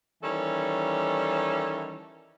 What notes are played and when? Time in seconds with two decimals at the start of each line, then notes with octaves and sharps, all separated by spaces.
0.23 D#3 E3 G3 C#4 A4 C#5